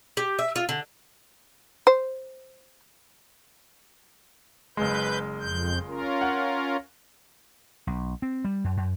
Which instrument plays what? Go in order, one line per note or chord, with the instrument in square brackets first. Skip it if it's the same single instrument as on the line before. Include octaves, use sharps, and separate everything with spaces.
[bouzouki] G4
E5
F4
D3
[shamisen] C5
[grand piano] F#1 G#3 [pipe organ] B4 G6
[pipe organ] F2 G6
C#4 F4 A#4
[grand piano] F#5
[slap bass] B1
C4
G3
F#2
F#2